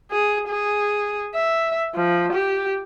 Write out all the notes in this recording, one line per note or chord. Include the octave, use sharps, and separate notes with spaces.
G#4
G#4
E5
F3
G4